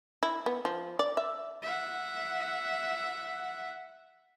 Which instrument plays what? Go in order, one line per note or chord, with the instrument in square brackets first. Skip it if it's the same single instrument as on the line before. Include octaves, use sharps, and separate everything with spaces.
[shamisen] E4
B3
F3
D5
E5
[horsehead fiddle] E5 F#5